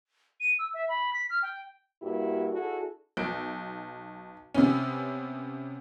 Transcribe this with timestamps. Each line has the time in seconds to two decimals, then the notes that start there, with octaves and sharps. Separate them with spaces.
0.40 D#7
0.59 E6
0.74 E5
0.89 B5
1.13 B6
1.30 F6
1.42 G5
2.02 G2 A#3 E4 F#4 G4
2.51 D4 E4 F#4 G#4 A4
3.17 B1 D7
4.54 C3 B3 C#4